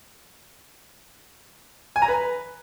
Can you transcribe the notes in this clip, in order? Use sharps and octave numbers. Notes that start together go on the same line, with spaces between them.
G#5
A#5
B4